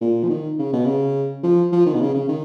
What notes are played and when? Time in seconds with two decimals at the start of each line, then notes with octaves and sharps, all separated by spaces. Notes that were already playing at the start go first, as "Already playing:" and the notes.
0.01 A#2
0.24 F3
0.29 D#3
0.59 C#3
0.73 B2
0.86 C#3
1.43 F3
1.72 F3
1.86 D#3
1.94 B2
2.01 C#3
2.15 C#3
2.28 D#3